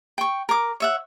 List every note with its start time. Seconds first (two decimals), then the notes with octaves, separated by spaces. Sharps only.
0.18 G5 C#6
0.49 A#4 D6
0.80 C#5 E5 F#5